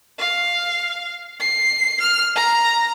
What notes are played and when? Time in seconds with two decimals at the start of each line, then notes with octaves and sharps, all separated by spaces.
0.19 F5
1.40 C7
2.01 F6
2.35 A#5